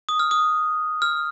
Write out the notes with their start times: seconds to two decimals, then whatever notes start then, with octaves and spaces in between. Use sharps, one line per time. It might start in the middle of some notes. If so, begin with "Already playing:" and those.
0.09 D#6
0.19 F6
0.31 D#6
1.02 F6